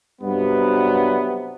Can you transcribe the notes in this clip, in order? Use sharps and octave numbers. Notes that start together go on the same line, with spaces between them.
G2 C3 F#3 G3 B3